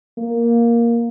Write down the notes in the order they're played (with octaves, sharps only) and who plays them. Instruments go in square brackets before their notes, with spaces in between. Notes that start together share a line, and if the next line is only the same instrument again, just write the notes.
[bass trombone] A#3